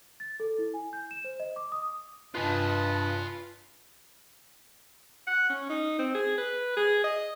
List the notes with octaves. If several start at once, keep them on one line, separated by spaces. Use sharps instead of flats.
A6
A4
E4
G#5
G6
E7
C5
D#5
D6
D#6
G2 F4 B4 D#5 G#5 A5
F#5
C#4
D#4
C4
G#4
B4
G#4
D#5